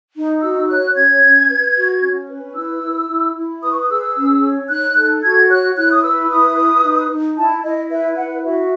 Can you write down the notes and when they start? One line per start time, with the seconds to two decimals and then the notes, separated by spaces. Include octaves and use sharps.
0.15 D#4
0.41 F#4 E6
0.68 C#5 F#6
0.94 C#4 G#6
1.22 C#4
1.49 B4
1.76 F#4
2.01 C#4
2.29 B4
2.55 E4 E6
2.82 E4
3.09 E4
3.35 E4
3.63 B4 D#6
3.70 C#6
3.79 D#6
3.89 G#4 E6
4.16 C#4
4.43 C#5
4.69 D#4 F#6
4.96 A4
5.22 F#4 G#6
5.49 C#5 F#6
5.76 E4 F#6
5.91 D#6
6.03 B4 E6
6.30 E4 D#6
6.56 B4
6.83 D#4
7.10 D#4
7.37 E4 A5
7.63 E4 D#5
7.90 B4 E5
8.16 E4 F#5
8.44 F#4 E5